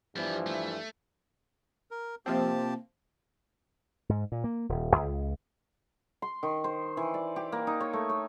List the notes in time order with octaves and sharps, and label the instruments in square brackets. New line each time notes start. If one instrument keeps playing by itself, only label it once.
[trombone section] G2 E3 F3 [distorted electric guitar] G3 B3
[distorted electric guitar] A3
[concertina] A#4
[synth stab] C3 F3 C4 [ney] A#3 [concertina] G4 A5
[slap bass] G#2
A#2
A#3
D#1
C#2
[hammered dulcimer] C6
D#3
C5
E3
D5
G4
A#3
D#4
C#5
A3
C#5